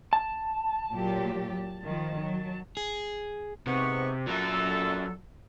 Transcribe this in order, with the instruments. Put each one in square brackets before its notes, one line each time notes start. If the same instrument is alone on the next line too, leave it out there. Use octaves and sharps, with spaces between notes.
[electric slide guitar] A5
[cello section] A#2 F#3 G4
D#3 F3
F#3
[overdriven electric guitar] G#4
[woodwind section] G#2 B3 C#6 [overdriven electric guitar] C3
[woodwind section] A#2 A4 [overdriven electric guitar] F#3 A#4